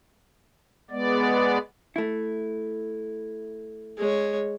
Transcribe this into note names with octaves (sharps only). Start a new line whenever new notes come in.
G#3 B3 D5
A3 E4
G#3 C#5